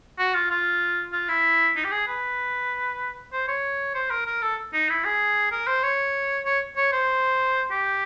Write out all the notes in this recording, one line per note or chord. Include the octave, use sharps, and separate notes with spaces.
F#4
F4
F4
F4
E4
D#4
G4
G#4
B4
C5
C#5
C5
A#4
A#4
A4
D#4
E4
G#4
A#4
C5
C#5
C#5
C#5
C5
G4